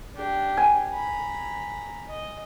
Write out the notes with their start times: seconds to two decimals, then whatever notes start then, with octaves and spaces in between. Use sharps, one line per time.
0.15 D4 G4
0.57 G#5
0.91 A#5 B5
2.08 D#5